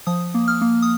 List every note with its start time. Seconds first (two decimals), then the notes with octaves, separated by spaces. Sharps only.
0.07 F3 D#6
0.34 A#3
0.48 F6
0.61 A#3
0.82 D#6